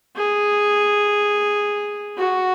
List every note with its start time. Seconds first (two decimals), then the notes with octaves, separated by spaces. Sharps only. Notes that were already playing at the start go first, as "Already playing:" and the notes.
0.16 G#4
2.18 F#4